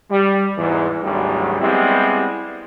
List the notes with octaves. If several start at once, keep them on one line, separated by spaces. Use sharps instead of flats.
G3
E2 G#2 E3
G#1 D2 G#2 F#3 G3
G3 G#3 B3 C4 E4 G4